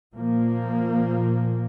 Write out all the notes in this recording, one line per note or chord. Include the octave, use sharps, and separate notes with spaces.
A#2 F3 A#3